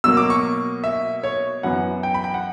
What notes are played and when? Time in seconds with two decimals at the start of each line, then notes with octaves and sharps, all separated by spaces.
0.04 B2 F#3 A#3 E6
0.17 D6
0.30 C#6
0.84 E5
1.23 C#5
1.63 F#2 E3 B3 F#5
2.03 G5
2.14 B5
2.24 G5
2.34 F#5